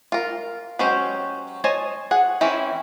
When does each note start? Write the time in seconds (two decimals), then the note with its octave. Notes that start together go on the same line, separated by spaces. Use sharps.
0.12 F4 A#4
0.79 F#3 G#3 C#4 G4 C5
1.64 C5 C#5 D#5 G#5 A5
2.11 G#4 F#5
2.41 E3 C4 C#4 E4